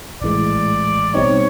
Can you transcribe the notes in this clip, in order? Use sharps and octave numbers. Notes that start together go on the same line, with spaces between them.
A#1 A2 E3 G#3 D5
B2 G3 C4 D#4 C#5